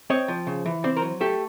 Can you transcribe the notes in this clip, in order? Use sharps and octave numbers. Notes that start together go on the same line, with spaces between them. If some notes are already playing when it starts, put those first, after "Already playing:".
C4 C#5 D#5
F3
C#3
E3
C4 C5 D5
A#4 C5
F#3
A3 G4 A4